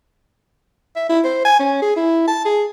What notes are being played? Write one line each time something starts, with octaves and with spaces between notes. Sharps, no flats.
E5
E4
C5
G#5
C#4
G#4
E4
A5
G#4